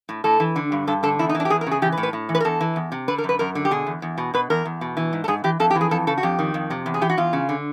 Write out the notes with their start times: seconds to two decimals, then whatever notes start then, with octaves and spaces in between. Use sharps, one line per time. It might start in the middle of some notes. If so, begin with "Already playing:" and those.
0.09 A2
0.24 A2 A4
0.40 E3
0.56 D3
0.72 G2
0.87 G2 A4
1.03 D3 A4
1.19 E2 E4
1.29 D#4
1.35 E3
1.40 D4
1.45 G4
1.50 E2 G#4
1.61 A#4
1.67 C#3 G#4
1.82 E3 G4
1.92 B4
1.97 A2
2.03 B4
2.13 A2
2.29 E3
2.35 B4
2.40 A#4
2.45 E2 A4
2.61 E3
2.76 E2
2.92 C3
3.08 D3 B4
3.18 A#4
3.24 F#2
3.29 B4
3.39 F#2 A#4
3.55 D3
3.65 G4
3.71 B2 G#4
3.86 E2
4.02 E2
4.18 B2
4.34 B2 B4
4.50 E2 A#4
4.65 E2
4.81 B2
4.97 E3
5.13 G#2
5.24 A4
5.28 G#2 G#4
5.44 E3 G4
5.60 F2 A4
5.70 G4
5.75 E3
5.81 G#4
5.91 F2 A4
6.07 C#3 A4
6.18 F#4
6.23 F2 G4
6.39 D#3
6.54 F2
6.70 C3
6.86 E2
6.94 G#4
7.01 E3 G4
7.09 F#4
7.17 E2 F4
7.33 C#3
7.49 D3